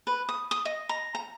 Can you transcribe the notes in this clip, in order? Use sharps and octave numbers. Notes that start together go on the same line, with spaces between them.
B4
D#6
D#6
D#5
A#5
A#5